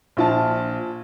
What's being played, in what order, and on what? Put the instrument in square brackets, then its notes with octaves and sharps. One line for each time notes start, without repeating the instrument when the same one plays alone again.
[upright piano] A#1 F4 A5